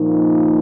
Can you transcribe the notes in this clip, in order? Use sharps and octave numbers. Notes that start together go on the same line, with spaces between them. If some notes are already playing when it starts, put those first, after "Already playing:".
Already playing: A#2 F3 A#3 D#4